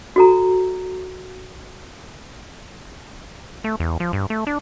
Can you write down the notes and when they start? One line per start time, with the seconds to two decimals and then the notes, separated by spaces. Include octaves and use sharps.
0.16 F#4 A4 A#5
3.64 A3
3.80 E2
4.00 F3
4.13 G2
4.30 A3
4.47 D4